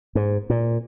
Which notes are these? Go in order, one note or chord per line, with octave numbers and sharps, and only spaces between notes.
G#2
A#2